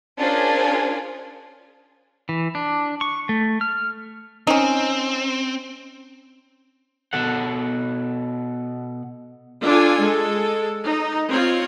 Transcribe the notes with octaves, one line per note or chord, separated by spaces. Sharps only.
C#4 D4 F4 G#4 A#4 C5
E3
D4
C#6
A3
F6
C4 C#4 D#4
B2 A4 F#5
D4 F4 A4 G#5
G#3 A4
D#4
C4 F4 C#5